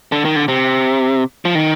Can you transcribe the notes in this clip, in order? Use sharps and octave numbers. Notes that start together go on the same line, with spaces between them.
D3
D#3
D3
C3
F3
D#3